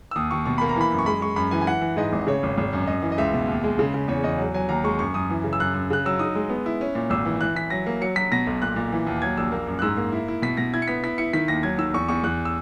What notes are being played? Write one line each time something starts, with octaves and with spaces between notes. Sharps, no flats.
E6
D#2 D#6
D#2 C#6
B2 C#6
A#3 B5
A#5
E3 B5
F#2
C#6
G#3 B5
G#3 C#6
F#2 B5
E3 G#5
G#5
E3 F#5
E3
G#2 D#5
G#1
C#3 C#5
G#1
G#1
F#2
F#2 D#5
E3
D#5
C#2 E5
B2
D#2
G#3
C#3
C#3
E2 C#5
E2 D#5
F#3
F#3 G#5
D#2 A#5
G#3 C#6
F#2 C#6
F#2 D#6
E3
C#3
E6
F#2 F#6
F#2
C#3 F#6
F#3 E6
D#4 D#6
G#3
B3
E4
C#4
A#2
G#1 E6
E3
E3 F#6
E3 B6
F#3 A#6
A#3
F#3 C#7
F#3 B6
B2 A#6
B1
A#2 F#6
A#2
E3
D#2
F#3 G#6
A#1 E6
A#3
F#2
F#6
G#2 E6
A#3
E4
E4
B2 B6
B2 A#6
E4 G#6
C#7
B3 B6
E4 B6
E4 C#7
D#3 B6
D#2 A#6
F#3 G#6
D#3 E6
E2 C#6
E2 C#6
E2 F#6
E6